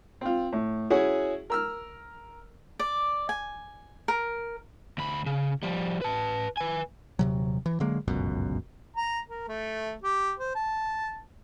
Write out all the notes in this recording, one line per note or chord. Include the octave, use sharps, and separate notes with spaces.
C4 F4
A2
C#4 E4 F#4 G#4 F#5
A#4 E6 F6
D5
G#5
A#4
D2 B5
C#3
F3 G3
B4 A5
B4 G#5
D#1 C3 F#3
E3
D3 F#3 G#3 A#3
G1 C#2 F#2 B2
A#5
A#4
A3
G4
C5
A5